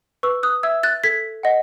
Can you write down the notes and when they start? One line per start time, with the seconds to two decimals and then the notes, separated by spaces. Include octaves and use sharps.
0.23 B4 C#6 E6
0.43 D#6 F#6
0.63 E5 E6 G#6
0.83 F#6 A6
1.04 A4 G#6 B6
1.43 D#5 F#5